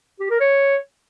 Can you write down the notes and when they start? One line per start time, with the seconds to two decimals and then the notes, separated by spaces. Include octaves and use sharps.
0.20 G4
0.30 A#4
0.40 C#5